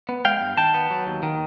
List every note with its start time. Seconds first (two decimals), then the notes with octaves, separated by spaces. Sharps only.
0.09 B3
0.25 G#3 F5 G5
0.41 G2
0.57 D#3 G5 A5
0.74 B3
0.91 F#3
1.07 D#2
1.23 D#3